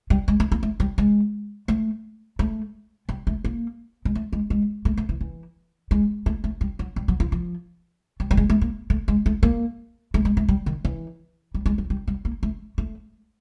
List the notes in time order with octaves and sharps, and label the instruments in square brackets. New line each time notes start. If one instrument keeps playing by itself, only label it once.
[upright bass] G3
G#3
A3
A#3
A3
G3
G#3
A3
A3
G3
A3
A#3
G#3
A3
G#3
G#3
A3
A3
E3
E3
G#3
A3
A3
G3
F#3
G3
F#3
F3
F3
G3
G3
G#3
A3
A#3
A3
G#3
A3
A#3
A3
G#3
A3
G3
D#3
E3
G3
G#3
G3
G3
G3
A#3
A3
A3